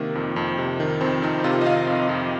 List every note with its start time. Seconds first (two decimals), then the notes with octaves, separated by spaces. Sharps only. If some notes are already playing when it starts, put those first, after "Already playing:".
Already playing: C3 D#3 A#3
0.15 F2
0.36 F2
0.58 C3
0.80 D#3
1.00 F2 C4
1.22 F2 D#4
1.44 C3 F4
1.61 D#5
1.66 D#3 F5
1.87 F2
2.09 F2